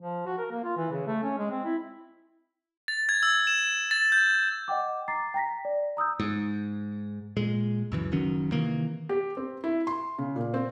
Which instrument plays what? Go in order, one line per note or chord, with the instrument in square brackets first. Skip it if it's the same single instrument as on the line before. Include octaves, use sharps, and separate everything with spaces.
[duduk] F3
F#4
A#4
A#3
F4
E3
C#3
A3
C#4
G#3
C4
E4
[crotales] A6
G#6
E6
E7
A6
G6
[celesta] D#5 F#5 G5 D6
A#5 D6 A6 C7
G5 A#5 A#6 B6
D5
A#5 D#6 E6 G6
[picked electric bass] G#2
A#2 G#3
C#2 F#2 E3
F#1 D#3 F#3 C#4
C3 D#3 E3 A#3
[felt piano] G4
C4
E4
C6
C#3
A#2
C4